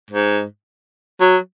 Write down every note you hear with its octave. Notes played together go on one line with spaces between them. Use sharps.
G#2
F#3